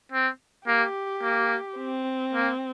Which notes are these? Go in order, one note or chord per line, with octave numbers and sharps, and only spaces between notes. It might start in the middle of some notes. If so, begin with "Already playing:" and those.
C4
A#3 G4
A#3
C4
A#3